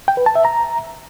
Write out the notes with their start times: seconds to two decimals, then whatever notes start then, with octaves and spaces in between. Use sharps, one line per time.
0.08 G5
0.17 B4
0.26 A5
0.35 E5
0.45 A#5